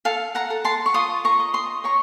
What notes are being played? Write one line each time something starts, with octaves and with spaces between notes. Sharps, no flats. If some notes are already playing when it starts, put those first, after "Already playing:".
A4 F5 A5
F#5 A#5
A4
A5 C6
C#6
F4 C6 D#6
A#5 C#6
D#5
C6 D#6
C#5 A#5 C#6